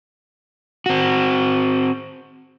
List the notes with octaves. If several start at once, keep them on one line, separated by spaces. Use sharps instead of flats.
C4 F#4